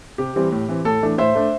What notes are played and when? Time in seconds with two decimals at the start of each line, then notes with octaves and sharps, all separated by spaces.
0.18 C3 G4
0.36 E3 G3 C4
0.52 A2
0.69 E3 C4
0.85 A2 A4
1.03 E3 A3 D4
1.18 A2 C5 E5
1.35 A3 D4